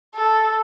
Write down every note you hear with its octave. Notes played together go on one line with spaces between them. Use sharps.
A4